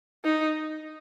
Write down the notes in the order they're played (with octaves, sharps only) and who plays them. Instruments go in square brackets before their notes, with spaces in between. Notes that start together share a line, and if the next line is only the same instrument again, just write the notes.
[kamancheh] D#4